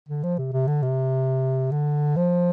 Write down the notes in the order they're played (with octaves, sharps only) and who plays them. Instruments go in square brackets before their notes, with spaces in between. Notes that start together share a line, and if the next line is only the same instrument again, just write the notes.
[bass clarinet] D3
F3
C3
C3
D3
C3
D3
F3